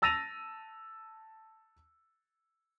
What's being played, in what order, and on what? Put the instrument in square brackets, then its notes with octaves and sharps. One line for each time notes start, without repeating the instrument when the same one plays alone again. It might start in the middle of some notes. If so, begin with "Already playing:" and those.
[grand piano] A5 E6 A6 A#6 D#7 F7